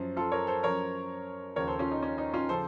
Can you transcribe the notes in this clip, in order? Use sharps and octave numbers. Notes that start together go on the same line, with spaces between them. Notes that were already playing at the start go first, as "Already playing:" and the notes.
Already playing: F#2 F3
F4 A4
A#4 C#5
A4 C5
F#2 F3 A#4 C#5
D#2 C#3 F3 A#4 C#5
A4 C5
C#4 F4
D#4
C#4
D#4
C#4 F4
C#3 F3 A4 C5